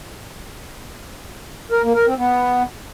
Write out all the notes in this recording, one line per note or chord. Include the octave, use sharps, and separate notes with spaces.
A#4
A#3
A#4
C4
B3